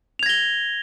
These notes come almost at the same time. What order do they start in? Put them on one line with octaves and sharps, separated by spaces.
F7 G#6 A#6 G7